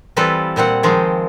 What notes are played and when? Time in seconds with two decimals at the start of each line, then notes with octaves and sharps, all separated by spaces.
0.17 E3 G3 C4 F4 A4 B4
0.56 A#2 G3 C4 F#5
0.83 D#3 F3 G#3 C4